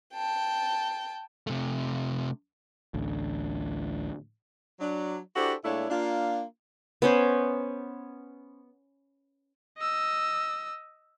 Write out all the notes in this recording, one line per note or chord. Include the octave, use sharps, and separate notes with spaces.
G5 A5
C3 A3
A1 D2
F#3 D4
D4 E4 F#4 G4 A4 C5
A#2 G#3 A3 D4 E4 C#5
A#3 D4 F4
B3 C#4 C5
D#5 E6